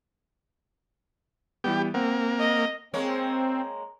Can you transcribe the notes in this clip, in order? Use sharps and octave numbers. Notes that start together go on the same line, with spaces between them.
E3 G3 B3 G4
A#3 C4 F#5
D#5
G#3 A#3 C4 C#5